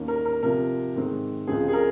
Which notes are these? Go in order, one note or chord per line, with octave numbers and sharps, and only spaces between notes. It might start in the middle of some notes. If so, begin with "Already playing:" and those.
Already playing: D#2 D#3 A#3 C#4
A#4
A#4
C3 F3 C4 A#4
G#2 D#3 G#3 C4
C#2 C#3 F3 C4 G#4
G#4
A#4